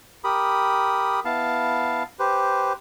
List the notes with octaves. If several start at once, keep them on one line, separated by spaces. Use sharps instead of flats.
G4 A#4 B5 D#6
B3 E4 F5 A5
G4 B4 C5